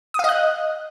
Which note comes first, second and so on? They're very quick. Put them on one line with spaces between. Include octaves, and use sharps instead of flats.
D#6 F5 D#5 F#6